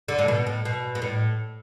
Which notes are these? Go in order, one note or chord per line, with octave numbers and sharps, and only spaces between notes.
D3
A2
B2
A2
B2
B2
A2